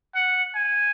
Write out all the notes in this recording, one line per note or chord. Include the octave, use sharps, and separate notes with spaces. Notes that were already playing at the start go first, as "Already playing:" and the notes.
F#5
G#5